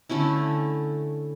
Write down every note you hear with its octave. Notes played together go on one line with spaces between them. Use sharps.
D3 A3 C#4 E4